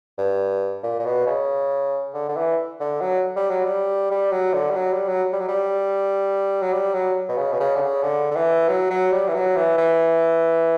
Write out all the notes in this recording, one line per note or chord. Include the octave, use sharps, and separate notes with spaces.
G2
A#2
A#2
B2
C#3
D3
D3
E3
D3
F#3
G3
F#3
G3
G3
F#3
D3
G3
F#3
G3
F#3
G3
F#3
G3
F#3
G3
F#3
B2
C#3
B2
C#3
D3
C#3
D3
D3
E3
F#3
F#3
G3
E3
F#3
E3
E3